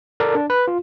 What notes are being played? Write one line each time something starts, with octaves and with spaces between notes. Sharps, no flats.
A4 A#4 D5
D4
B4
F4